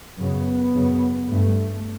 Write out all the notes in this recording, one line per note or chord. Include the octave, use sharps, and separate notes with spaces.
F#2 C#3 B3
F#2 C#3
G2 A3